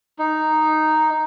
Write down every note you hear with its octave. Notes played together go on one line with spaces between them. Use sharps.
D#4